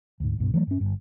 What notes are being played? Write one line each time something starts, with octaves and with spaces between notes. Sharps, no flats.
D2 G#2
C2 G2 B2
E3 F#3 A3
G2 C#4
G1 G2